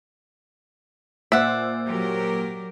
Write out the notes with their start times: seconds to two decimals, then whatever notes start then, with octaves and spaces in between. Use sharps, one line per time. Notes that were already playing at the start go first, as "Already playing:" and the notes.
1.32 A#2 C5 D5 E5 F#5 E6
1.88 F#3 G4 A#4